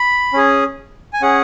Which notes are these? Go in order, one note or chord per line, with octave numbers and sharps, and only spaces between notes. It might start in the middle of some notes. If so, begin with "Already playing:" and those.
Already playing: B5
C#4 G#4
G#5
C#4 G#4 F#5